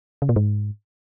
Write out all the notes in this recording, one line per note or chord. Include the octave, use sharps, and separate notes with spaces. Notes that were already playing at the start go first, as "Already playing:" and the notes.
C#3
A#2
G#2